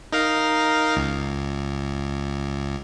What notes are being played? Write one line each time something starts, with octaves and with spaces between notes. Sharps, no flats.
D#4 A#4 F5
C#2